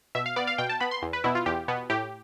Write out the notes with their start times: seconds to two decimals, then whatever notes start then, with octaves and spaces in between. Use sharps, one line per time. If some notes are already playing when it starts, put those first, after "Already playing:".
0.15 B2 E5
0.26 F5
0.36 B3 D5
0.47 F5
0.58 B2 G5
0.69 A5
0.80 B3 B5
0.91 C6
1.02 E2
1.13 B4
1.24 B2 B3 E4
1.35 F4
1.46 E2 G4
1.68 B2 B3
1.90 A2 G4